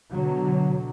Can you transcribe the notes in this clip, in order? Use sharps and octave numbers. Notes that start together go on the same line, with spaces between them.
B2 D3 F#3